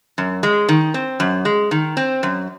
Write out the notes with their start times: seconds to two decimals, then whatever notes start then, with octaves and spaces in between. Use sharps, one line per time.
0.18 F#2
0.43 G#3
0.69 D#3
0.94 C4
1.20 F#2
1.45 G#3
1.71 D#3
1.97 C4
2.23 F#2